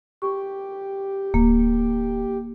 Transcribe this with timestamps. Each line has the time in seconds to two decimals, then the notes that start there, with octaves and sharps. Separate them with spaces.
0.22 G4 C#6
1.34 D1 A#3